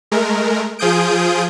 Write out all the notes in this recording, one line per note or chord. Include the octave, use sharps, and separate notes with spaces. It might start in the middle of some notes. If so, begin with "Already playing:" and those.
G#3 A3 A#4
F3 F4 G#4 D#6 G6 D7